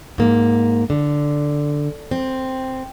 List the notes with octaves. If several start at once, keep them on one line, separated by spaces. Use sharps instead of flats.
G#2 A#3
D3
C4